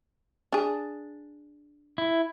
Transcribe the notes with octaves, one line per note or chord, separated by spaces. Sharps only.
D4 G#4
E4